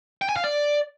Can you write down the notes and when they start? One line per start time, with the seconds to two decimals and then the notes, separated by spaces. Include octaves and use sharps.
0.22 G5
0.29 G#5
0.36 F5
0.44 D5